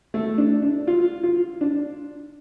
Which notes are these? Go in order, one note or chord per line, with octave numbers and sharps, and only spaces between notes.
A3
D4
D4
F4
F4
D4